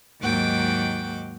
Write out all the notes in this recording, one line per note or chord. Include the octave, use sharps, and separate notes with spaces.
D#2 G#2 F#3 F#4 G5 D6